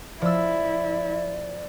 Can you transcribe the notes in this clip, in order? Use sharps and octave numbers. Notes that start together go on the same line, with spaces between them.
F3 E4 D5 E6